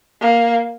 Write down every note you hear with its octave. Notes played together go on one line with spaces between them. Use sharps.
A#3